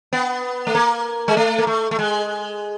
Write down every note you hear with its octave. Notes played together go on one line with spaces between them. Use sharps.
B3
A3
A#3
G#3
A3
A#3
A3
A3
G#3